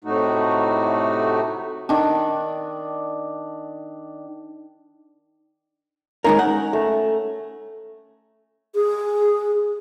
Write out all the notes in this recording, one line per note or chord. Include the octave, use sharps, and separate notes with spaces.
A2 C3 A3 D#4 F#4
D#3 D4
G#3 C#4 D#4 A#4 A#5
F#5
A3
G#4